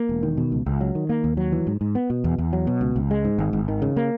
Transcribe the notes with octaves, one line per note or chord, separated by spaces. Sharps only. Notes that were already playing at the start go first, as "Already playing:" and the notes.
Already playing: A#3
E1
D#3
B2
C#2
C#2
F#3
D#3
A#3
D#2
F#3
E3
G#2
G#2
B3
B2
E2
E2
F#3
B2
C#2
C#2
G#3
G#2
G#1
G#1
D#3
C#3
A#3